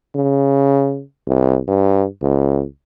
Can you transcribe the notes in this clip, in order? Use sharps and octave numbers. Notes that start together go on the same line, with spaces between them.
C#3
C2
G2
C#2